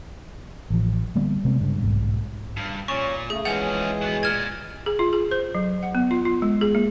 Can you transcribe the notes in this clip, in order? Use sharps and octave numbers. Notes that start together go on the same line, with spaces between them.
A1 F3
D3 G3 A#3 B3
C3 G#3 B3 C4
G2 C#3
B1 G#2 B2
G2
A#2 C#4 C#6
C#3 A3 G#4
E3 F3 G#3 C#4 G#4 F#5
F#3 B3
A#2 F6 G#6
G#4
F4
G#4
C5
F#3
F#5
B3
F4
F4
G#3
G#4
A#3